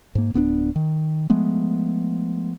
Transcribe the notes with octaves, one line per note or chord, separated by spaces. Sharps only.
G#2 A#3
D1 B3 C4 D4
D#3
F3 G#3 A3 B3